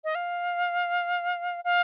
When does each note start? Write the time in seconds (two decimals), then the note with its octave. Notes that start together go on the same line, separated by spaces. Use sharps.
0.04 D#5
0.15 F5
1.64 F5